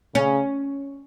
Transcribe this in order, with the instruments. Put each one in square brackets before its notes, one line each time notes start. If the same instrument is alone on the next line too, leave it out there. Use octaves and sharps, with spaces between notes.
[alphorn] C#3 [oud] C#4